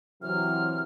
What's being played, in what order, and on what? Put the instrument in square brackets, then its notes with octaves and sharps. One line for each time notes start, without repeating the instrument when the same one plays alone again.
[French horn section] C3 E3 F#3 [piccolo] F6